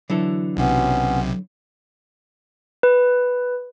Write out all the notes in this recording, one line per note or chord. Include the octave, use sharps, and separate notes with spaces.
D3 E3 F#3 A4
B1 C3 B3 C#4
B4